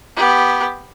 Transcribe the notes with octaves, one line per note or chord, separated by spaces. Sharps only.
B3 G4